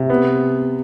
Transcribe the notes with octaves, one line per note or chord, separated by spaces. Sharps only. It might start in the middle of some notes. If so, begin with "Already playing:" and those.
Already playing: C3
B3